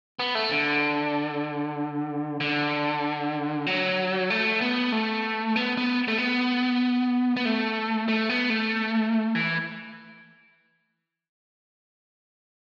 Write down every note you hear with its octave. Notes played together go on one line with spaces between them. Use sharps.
B3
A3
D3
D3
F#3
A3
B3
A3
B3
B3
A3
B3
B3
A3
A3
B3
A3
E3